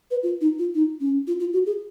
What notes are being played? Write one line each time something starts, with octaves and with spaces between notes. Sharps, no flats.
B4
F4
D#4
F4
D#4
C#4
F4
F4
F#4
G#4